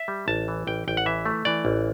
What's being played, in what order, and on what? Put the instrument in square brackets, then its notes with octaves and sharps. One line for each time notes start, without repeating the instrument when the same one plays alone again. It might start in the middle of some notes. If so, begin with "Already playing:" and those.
Already playing: [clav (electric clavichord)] E5
G3
A1 A5
E3
A1 G5
A1 G5
F#5
E3 E5
A3
E3 D5
A1